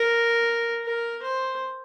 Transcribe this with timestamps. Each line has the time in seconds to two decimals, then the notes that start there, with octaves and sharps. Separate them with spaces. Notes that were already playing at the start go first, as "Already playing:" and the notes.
Already playing: A#4
0.84 A#4
1.23 C5